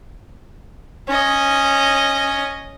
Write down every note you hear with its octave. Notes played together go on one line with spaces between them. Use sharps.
C#4 D#5